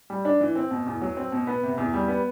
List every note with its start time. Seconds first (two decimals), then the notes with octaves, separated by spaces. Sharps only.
0.10 G3
0.25 D4
0.40 E3
0.55 C4
0.71 B2
0.87 E2
1.01 F#3
1.17 C4
1.32 B2
1.47 B3
1.63 C3
1.78 E2
1.94 G3
2.08 B3